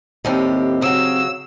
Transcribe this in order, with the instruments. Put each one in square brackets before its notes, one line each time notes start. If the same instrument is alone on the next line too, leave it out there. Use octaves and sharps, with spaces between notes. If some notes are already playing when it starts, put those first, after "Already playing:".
[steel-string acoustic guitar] D#2 A2 G4 [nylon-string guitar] C4 D5 D#5
[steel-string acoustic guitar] C#3 F#3 [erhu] E6